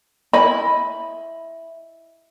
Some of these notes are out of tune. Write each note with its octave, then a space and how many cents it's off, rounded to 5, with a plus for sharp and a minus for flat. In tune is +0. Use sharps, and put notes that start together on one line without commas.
E4 +0 D#5 +10 B5 -5